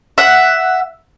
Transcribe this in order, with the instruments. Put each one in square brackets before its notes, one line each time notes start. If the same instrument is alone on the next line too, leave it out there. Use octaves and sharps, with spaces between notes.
[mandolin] E5 F#5